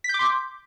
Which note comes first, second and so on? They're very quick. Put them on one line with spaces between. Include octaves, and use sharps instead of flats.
B6 G6 D6 C6